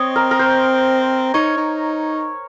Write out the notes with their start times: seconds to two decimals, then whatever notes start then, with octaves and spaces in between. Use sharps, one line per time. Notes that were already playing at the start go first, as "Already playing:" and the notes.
Already playing: C4 C#5 D#5
0.16 A#4
0.31 A#4
0.39 C5
1.34 D#4 C#5
1.57 D#4